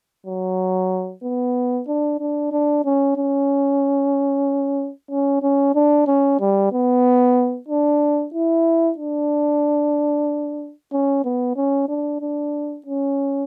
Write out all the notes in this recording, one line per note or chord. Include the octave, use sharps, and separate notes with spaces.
F#3
B3
D4
D4
D4
C#4
C#4
C#4
C#4
D4
C#4
G3
B3
D4
E4
D4
C#4
B3
C#4
D4
D4
C#4